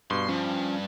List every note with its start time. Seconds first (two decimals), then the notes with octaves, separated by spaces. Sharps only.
0.10 G2 B2 C6
0.28 G2 F3 C#4